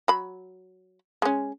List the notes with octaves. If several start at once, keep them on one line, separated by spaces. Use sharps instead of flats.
F#3 B5
G#3 C#4